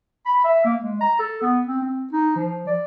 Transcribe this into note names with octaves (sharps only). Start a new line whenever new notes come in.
B5
E5
A#3
G#3
A#5
A4
B3
C4
C4
D#4
F3
D5